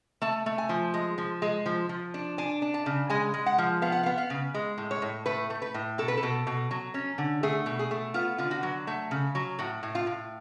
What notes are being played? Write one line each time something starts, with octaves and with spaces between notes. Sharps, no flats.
A3 A5
A3
G#5
F3
G#3
F3
G#3
F3
F3
D4
D4 G#5
D4
A5
C#3
G#3 G#5
G#3
F#5
F3
B3 F5
F#5
F5
B3
F5
C#3
G#3
A2
C#5
A2
A3 B4
A3
B4
A2
B2 A4
B4
A4
B2
B2
F#3
C#4
D3
A3 G#4
B2
G#4
A3
B3 F4
D3 F4
F#4
F#3
A3
C#3
F#3
A2 F#4
A2
F4
A2